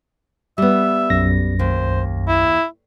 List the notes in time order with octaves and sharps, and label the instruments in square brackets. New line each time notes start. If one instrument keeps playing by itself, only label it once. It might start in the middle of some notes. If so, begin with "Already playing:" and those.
[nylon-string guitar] G3 B3 [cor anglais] E5
[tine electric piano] B1 F#2 A#6
[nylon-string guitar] D#2 [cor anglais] C5
[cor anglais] E4